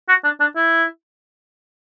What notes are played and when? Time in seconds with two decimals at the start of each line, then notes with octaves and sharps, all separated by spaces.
0.08 F#4
0.24 D4
0.40 D4
0.56 E4